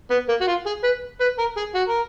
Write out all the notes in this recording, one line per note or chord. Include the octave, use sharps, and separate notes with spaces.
B3
A#3
F#4
F4
G#4
B4
B4
A#4
G#4
F#4
A#4